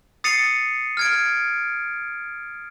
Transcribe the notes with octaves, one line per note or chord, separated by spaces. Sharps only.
D#6 A6 C7 C#7 D#7 F7
F6 G#6 D7